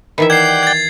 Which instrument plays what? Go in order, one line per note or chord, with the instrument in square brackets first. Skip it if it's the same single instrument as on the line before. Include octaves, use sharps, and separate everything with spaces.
[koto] D#3 E3 E5 [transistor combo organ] B4
[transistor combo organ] D5 F#5 G5 [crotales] G#6 C7
[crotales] G#6 A6